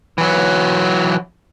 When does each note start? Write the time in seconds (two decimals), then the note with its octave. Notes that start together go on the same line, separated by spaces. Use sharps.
0.18 E3 F#3